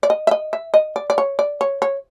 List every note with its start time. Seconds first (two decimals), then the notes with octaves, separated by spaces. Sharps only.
0.03 D5
0.10 D#5
0.27 E5
0.31 D#5
0.53 E5
0.74 D#5
0.96 D5
1.10 D5
1.18 C#5
1.39 D5
1.61 C#5
1.82 C#5